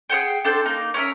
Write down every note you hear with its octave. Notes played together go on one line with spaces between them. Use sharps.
G#4 C5 F#5 G5
D4 A4 C5 G5
A#3 D#4
C#4 A#4 E5